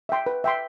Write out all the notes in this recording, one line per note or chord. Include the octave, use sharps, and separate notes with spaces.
E5 G5 C6
B4
E5 G5 C6